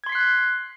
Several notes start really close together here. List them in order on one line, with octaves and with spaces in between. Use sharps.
G#6 C6 B6 C7 F#6